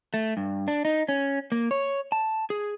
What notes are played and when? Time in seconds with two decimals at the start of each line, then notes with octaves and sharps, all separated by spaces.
0.14 A3
0.37 G2
0.68 D4
0.85 D#4
1.09 C#4
1.52 A#3
1.71 C#5
2.12 A5
2.50 G#4